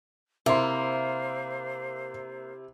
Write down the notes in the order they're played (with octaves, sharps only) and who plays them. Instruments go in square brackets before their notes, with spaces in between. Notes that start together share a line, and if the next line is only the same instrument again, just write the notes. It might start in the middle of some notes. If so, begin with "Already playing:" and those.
[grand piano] C3 E4 [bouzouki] A#3 [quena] C5 [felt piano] E5 C6